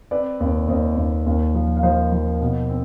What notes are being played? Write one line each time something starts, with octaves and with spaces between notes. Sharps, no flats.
C4 B4 D5
D#2
D#2 C5 D#5
D#2
D#2
F3
F5
F3 C5 D#5
F3
B2
C4